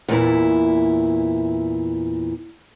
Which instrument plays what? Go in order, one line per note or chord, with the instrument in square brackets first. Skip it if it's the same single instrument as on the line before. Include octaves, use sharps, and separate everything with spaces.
[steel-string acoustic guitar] E2 A#2 E4